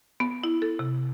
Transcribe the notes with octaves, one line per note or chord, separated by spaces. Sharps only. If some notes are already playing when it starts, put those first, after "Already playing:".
B3
E4
A4
C3